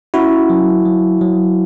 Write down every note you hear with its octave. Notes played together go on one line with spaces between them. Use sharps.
C#4 E4 F#4
F#3
F#3
F#3